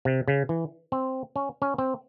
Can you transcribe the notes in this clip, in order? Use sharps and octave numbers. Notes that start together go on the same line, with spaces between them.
C3
C#3
E3
C4
C#4
C#4
C4